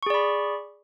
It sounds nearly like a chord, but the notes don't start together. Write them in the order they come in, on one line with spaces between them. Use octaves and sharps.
C#6 G#4 D5 B5